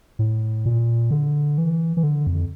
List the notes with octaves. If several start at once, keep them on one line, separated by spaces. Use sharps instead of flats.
A2
A#2
D3
E3
E3
D3
F2